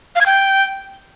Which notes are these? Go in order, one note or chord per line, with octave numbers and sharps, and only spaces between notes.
F5
G#6
G5